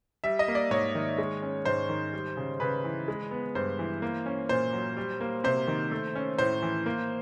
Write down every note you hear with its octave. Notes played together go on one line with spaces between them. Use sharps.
G3 E5
D#5
A#3
D5
G#2 C#5
D#3
G#3
C#4
G#2 C5
D#3
G3
C#3
C#3 B4
E3
G#3
B3
G2 C5
E3
A#3
C#4
A#2 C5
F#3
G3
A#3
C3 C5
D#3
A3
C#4
A2 C5
E3
A#3